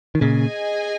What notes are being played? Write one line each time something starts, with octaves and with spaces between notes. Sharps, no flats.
D#3
A#2 C#3 G#4 D#5 G#5